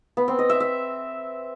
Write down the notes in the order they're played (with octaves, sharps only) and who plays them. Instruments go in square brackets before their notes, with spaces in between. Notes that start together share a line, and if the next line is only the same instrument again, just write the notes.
[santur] B3
C4
D#5
E5
E5